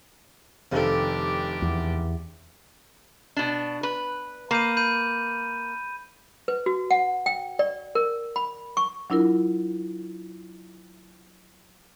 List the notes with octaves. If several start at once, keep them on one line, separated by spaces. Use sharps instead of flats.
F1 C3 D#3 D4 G4 A4 F5
E2
B2 D4
B4
A#3 B5 G6 D#7
B5 G6 D#7
B4
F#4
F#5
G5
D5
A#4
B5
C#6
F#3 D4 E4 F4 A#4